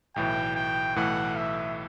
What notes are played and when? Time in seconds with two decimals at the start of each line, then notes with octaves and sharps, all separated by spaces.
0.16 B1 A2 E3 G5
0.55 G5
0.96 B1 A2 E3 A3 F#5
1.37 E5